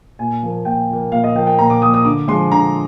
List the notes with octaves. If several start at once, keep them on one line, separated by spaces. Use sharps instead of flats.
A#2 G#5
F3 A#3
A#2 G5
F3 A#3
A#2 F5
D#5
F3 A#3 G5
G5
A#2 A#5
D6
F3 A#3 D#6
D#6
D3 D6
F3 G#3 C6
D3 A#5